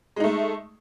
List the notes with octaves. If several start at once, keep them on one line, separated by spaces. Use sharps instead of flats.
G#3 A3 D#4